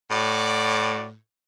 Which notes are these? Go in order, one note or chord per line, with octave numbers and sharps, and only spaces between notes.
A2 F#4 D5